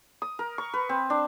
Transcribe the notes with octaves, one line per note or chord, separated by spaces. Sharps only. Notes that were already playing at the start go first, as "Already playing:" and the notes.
D#6
A#4
C#6
B4
C4
D4